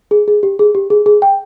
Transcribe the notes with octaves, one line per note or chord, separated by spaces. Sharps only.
G#4
G#4
G4
G#4
G4
G#4
G#4
G5